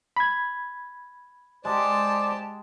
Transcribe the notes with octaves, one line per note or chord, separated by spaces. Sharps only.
B5 G#6
G#3 G4 C5 D5 A5